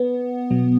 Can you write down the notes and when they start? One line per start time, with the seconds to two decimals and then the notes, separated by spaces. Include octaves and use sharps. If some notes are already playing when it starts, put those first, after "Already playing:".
Already playing: B3
0.51 B2 F#3